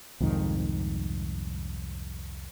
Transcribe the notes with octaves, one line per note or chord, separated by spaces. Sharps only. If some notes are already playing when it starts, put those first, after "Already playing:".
C2 F2 G#2 D#3